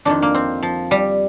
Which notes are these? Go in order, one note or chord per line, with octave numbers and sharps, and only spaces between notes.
F2 D#3 D4
A#3
C4
F3
G3